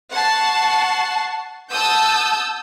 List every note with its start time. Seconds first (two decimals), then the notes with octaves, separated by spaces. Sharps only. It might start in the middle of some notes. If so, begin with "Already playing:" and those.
0.13 F#5 A5 C#6 C7
1.71 F#5 A5 D#6 E6 G6